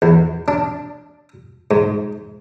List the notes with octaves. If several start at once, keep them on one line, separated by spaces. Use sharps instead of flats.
E2
D4
G#2